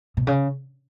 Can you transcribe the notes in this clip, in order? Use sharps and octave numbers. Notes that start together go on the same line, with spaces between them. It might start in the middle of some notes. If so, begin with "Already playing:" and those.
B2
C#3